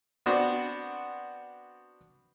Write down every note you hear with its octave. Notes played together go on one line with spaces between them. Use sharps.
B3 C4 D4 F#4